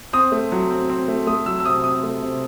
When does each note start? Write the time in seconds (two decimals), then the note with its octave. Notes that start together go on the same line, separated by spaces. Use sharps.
0.13 C4 D#6
0.32 A3
0.52 F#3
0.70 C4
0.89 C4
1.08 A3
1.27 A3 D#6
1.46 F#3 E6
1.60 E6
1.65 C3 D#6
1.84 C4 D#6
2.03 A3
2.22 C3